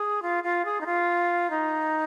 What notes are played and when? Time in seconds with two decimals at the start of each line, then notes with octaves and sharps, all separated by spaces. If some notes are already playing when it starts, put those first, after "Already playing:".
Already playing: G#4
0.22 F4
0.44 F4
0.65 G#4
0.81 D#4
0.86 F4
1.50 D#4